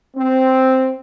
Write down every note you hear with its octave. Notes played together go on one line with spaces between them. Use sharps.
C4